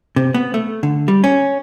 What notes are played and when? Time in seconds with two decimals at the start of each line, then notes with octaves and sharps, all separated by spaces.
0.16 C3
0.34 B3
0.54 A3
0.83 D3
1.08 G3
1.24 C#4